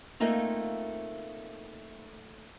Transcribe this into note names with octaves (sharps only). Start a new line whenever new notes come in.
A3 A#3 C4 D#4 F4